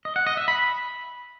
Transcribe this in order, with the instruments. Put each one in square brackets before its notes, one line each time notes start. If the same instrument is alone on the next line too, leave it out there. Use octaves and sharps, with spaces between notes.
[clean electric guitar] D#5
F#5
D#5
E5
B5